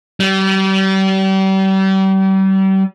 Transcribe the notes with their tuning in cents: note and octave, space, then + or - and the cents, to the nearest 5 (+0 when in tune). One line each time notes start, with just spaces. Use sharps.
G3 -35